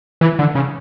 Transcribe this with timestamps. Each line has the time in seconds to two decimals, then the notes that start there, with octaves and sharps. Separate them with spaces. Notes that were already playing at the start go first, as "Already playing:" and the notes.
0.21 E3
0.39 D3
0.55 C#3